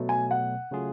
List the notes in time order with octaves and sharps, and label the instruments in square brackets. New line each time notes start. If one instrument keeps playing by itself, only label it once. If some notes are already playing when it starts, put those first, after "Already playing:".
Already playing: [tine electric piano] B2 F#3 A3
[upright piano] G#5
F#5
[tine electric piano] C#3 F#3 A3 F4 G#4